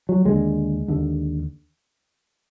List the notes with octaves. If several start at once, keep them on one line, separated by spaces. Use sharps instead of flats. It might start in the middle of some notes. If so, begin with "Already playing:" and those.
F#3
D#2 D3 G#3
D#2 D3